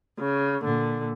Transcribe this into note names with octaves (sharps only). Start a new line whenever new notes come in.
C#3
A#2 D3